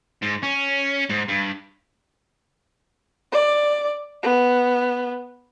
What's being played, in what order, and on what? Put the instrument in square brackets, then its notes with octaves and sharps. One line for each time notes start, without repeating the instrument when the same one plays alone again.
[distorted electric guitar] G#2
C#4
G#2
G2
[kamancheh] D5
B3